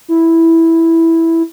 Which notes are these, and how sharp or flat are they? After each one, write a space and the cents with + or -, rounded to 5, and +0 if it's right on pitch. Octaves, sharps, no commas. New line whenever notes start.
E4 -5